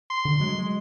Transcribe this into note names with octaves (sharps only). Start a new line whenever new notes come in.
C6
D3
F#3 G#3
G#3